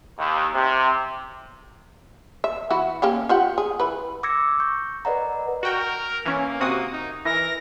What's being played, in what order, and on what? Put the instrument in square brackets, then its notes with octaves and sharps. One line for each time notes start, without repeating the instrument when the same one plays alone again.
[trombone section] D#2
C3
[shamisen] E5
E3 E4 F#4
A#3 C#4 G4
F4 G4 F#5
G#4
E3 B4
[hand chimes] D6 E6 G#6 A#6 C#7
C#6 G6
A#4 B4 D5 D#5 F#5 A#5
[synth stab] F#4 G5 [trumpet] A#4
[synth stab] E3 C#4 [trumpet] A#3
[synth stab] C3 F#4 D#6
[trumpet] D#4
[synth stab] E3 [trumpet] A#4 [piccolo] A#6